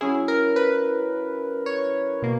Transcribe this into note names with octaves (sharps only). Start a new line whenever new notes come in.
F#3 C#4 E4 G#4
A#4
B4
C#5
B2 A#3